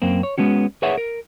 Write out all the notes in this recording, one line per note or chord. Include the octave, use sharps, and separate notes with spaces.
F#2 A#3 C4
C#5
G#3 B3 C#4 F#4
G#4 B4 C#5 E5 F#5
A#4